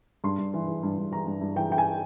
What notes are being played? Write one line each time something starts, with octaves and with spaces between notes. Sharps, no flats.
G2 C6
G2
E3
E3
G2
G2
E3 A#5
G2
G2
E3 G5
E3 G5
G#5